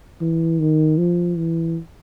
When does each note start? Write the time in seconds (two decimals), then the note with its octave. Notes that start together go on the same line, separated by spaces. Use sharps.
0.21 E3
0.59 D#3
0.98 F3
1.37 E3